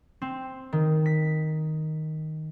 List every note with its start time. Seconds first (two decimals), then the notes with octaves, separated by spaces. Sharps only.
0.22 C4
0.73 D#3
1.06 B6